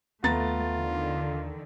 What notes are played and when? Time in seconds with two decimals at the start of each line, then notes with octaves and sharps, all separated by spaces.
0.24 D#2 A3 B3 F4 A#5 A6
0.79 D3 D#3